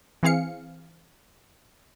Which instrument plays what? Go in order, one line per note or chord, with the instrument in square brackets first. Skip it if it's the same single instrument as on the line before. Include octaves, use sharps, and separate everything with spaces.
[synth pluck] E3 C4 G#4 F5 C#7